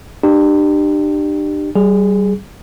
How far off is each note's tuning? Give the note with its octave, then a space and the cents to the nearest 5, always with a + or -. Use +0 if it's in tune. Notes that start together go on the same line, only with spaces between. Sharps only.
D4 +40 G4 +0
G3 -25 G#4 +0